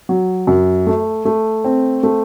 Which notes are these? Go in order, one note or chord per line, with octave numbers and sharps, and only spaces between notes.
F#3
F#2
A3
A3
C4
A3